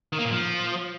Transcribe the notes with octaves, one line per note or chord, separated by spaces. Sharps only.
D#3
A#3
A#2
F3